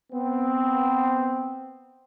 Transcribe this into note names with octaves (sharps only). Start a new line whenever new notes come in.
B3 C4